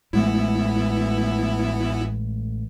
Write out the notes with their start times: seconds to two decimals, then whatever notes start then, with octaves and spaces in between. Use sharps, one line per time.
0.13 A1 E3 G#3 A3 B3 E4